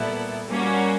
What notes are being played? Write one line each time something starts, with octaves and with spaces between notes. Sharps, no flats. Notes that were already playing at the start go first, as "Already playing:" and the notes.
Already playing: A#2 G3 B3 E4 A4
G3 A#3 C#4 F#4